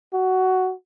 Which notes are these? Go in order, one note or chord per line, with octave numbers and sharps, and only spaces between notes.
F#4